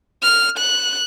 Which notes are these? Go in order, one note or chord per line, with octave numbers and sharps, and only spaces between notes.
F6
F#6